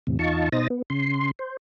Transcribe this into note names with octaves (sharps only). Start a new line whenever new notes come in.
E2 A2 C3
E2 D#4 F4 A5 C#6
B2 D#4 C5 D#6 A6 A#6
B3
C#3 C6
C5